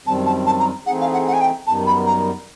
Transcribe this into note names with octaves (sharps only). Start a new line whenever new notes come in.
F#2 D#3 G3 C4 A5
A5
A5
A#5
E3 A3 C4 D#4 G#4 F#5
F5
F#5
F#5
G#5
G5
F#2 D#3 G3 B3 D#4 A5
B5
A#5